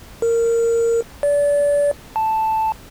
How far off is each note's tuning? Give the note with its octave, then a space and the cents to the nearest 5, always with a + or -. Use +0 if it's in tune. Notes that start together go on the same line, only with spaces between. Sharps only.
A#4 -15
D5 -30
A5 +0